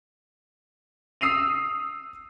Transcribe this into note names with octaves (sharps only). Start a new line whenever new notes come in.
D#6 E6 C7 D#7 F7